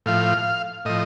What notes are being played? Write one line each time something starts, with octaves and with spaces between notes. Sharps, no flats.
A2 F3 F5
A2 F3 D#5